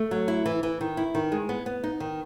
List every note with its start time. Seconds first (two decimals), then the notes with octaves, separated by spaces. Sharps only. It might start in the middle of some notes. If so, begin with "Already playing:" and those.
Already playing: A3
0.11 F#3
0.28 E4
0.46 E3
0.63 E3
0.81 D#3
0.97 E4
1.15 D#3
1.32 G#3
1.49 B3
1.66 B3
1.84 D#4
2.00 D#3